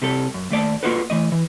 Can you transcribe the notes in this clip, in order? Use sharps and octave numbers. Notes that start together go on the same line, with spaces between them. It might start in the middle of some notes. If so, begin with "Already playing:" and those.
C3 G3 A4
F#2
D#2 A3 D5 A5
A#3 B3 F4 F#4 A4 B4
E3 A3 D#5
E3